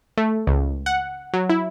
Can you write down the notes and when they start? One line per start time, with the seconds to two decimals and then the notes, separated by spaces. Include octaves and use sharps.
0.17 A3
0.47 C#2
0.86 F#5
1.34 F#3
1.50 E4